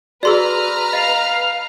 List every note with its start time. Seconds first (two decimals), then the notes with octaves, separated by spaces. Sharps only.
0.23 F#4 G#4 B4 D5 A#5 C6 E6 F6
0.93 D#5 F5